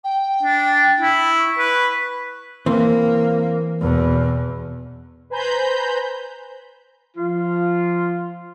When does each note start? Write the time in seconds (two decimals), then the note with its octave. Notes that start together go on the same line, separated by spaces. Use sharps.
0.04 G5
0.43 D4
1.01 E4
1.38 C#6
1.58 B4
2.66 E3 A#3 C4
3.81 E2 B2
5.30 B4 C5 G#5 A#5 B5 G6
7.17 F3 F4